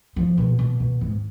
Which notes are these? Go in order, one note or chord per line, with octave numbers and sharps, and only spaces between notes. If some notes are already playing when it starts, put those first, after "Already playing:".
F3
B2
B2
B2
G#2